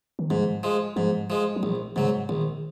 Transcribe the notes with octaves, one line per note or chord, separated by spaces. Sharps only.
D#3
G#2 F3
F3 G#3
G#2 F3
F3 G#3
F#3
A#1 F3
G#2 C#3 F#3
A#1 D#3